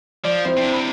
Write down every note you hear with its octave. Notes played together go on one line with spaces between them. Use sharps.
F3 D5
C4 E4 C5 C6
C3 D4
B5